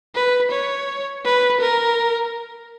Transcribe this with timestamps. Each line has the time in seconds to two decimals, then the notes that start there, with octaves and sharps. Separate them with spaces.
0.15 B4
0.51 C#5
1.25 B4
1.61 A#4